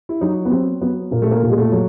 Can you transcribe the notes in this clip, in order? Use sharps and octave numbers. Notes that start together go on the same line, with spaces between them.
E4
F#3 D#4
B3
F#3 C4
F#3 B3
A#2 A#3
A3
A#3
A#2
G#3
A3
F#3